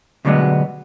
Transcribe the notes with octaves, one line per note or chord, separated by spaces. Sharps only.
D2 B2 D3 F#3 G#3 B3